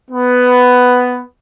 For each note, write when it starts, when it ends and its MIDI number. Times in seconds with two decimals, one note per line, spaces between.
0.11 1.22 59